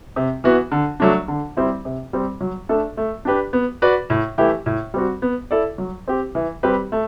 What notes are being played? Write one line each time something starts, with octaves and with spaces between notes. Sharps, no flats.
C3
E3 B3 F#4
D3
F#3 A3 D4
D3
G3 C4 E4
C3
G3 C4
F#3
A3 D4 A4
A3
D4 G4 B4
B3
F#4 B4 D5
A2
E3 A3 E4 G4
A2
G3 C4 F#4
B3
E4 A4 D5
F#3
C4 G4
E3
G3 C4 G4 B4
A3